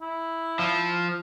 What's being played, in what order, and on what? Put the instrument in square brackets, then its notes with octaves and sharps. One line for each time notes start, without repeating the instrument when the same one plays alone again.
[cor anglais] E4
[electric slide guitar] F3